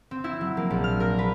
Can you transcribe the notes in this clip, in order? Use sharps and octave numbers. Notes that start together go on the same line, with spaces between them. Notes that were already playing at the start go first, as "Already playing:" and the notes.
C4
E4
F#3
A#3
A#1
F6
A#4
B4